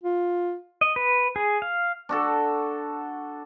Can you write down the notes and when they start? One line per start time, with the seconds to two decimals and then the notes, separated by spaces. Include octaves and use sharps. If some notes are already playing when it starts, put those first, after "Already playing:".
0.03 F4
0.81 D#5
0.96 B4
1.36 G#4
1.62 F5
2.09 D4 F#4 A4